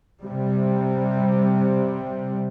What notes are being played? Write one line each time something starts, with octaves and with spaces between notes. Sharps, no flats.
C3 G3